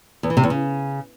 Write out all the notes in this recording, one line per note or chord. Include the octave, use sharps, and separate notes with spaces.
E2
E3
C3
E2
C#3